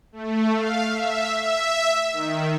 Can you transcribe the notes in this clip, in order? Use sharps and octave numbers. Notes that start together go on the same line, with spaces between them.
A3
F5
E5
E5
D#3